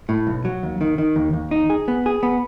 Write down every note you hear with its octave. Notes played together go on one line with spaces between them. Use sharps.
A2
B1
F#3
D#2
D#3
D#3
D#2
D#2
D#4
G#4
B3
G#4
B3